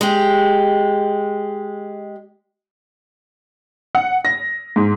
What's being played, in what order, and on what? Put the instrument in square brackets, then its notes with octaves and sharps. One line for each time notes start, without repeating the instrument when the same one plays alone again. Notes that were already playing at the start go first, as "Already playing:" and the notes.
[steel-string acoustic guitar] G#3 G4
[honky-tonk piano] F#5
A#6
G#2